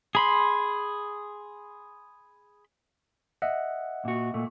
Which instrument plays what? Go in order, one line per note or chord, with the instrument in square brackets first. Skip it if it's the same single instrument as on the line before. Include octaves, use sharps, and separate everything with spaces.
[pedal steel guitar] G#4 B5 C6
[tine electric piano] D#5 E5 F#5
[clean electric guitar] A#2 F#4
A#2 A3